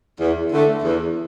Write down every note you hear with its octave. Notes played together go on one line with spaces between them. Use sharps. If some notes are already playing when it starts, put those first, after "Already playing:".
E2
D3 A3
E2